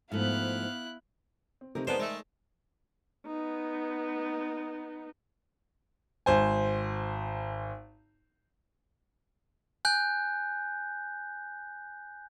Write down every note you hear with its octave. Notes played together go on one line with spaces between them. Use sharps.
G#2 F3 A3 B3 E4 F5 F#6
C4
C3 A3 C4 D#4 G4 A#4
G#3 B3 D#4 A#4 C5 D5 A5
G#3 A3
B3 D#4
G#1 C5 G#5
G#5 F#6 G6